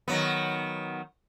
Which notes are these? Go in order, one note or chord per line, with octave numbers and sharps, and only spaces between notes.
D#3 F#3 B3